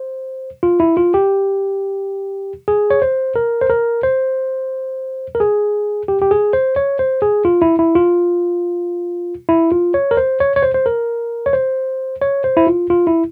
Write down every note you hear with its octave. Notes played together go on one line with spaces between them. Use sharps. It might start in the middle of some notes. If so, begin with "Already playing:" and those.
Already playing: C5
F4
E4
F4
G4
G#4
C#5
C5
A#4
C5
A#4
C5
A#4
G#4
G4
G4
G#4
C5
C#5
C5
G#4
F4
E4
E4
F4
E4
F4
C#5
A#4
C5
C#5
C#5
C5
C5
A#4
C#5
C5
C#5
C5
E4
F4
F4
E4